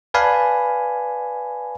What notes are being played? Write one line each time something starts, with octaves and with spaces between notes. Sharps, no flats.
B4 D5 F5 G#5 A5 B5